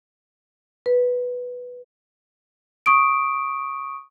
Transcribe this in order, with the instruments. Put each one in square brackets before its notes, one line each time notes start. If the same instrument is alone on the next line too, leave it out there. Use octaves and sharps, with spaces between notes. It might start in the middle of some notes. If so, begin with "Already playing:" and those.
[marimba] B4
[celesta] C#6 D#6 D7